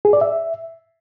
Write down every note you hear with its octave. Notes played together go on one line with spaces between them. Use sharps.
G#4
D5
E5